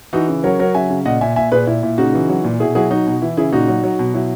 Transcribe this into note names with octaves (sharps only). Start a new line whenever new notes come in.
E3 D#4 F#4
C#3
F#3 A#4 C#5
F#3 A#4 C#5
C#3 E5 G#5
C#3
A#2 D#5 F#5
A#2 E5 G#5
A#2 E5 G#5
A#2 G#4 B4
A#2 E4
A#2 E4
C#3 D#4 F#4
E3
F#3
A#2
B2 E4 G#4
F#3 E4 G#4
F#3 D#4 F#4
B2
E3 E4
C#3 E4 G#4
A#2 D#4 F#4
F#3
F#3
B2
F#3 E4